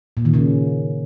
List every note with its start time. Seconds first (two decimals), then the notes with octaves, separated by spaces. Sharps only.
0.17 A#2
0.25 D#3
0.34 C#3